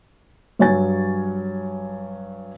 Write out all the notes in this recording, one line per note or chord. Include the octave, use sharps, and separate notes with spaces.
G2 F#3 C#5 G#5 A6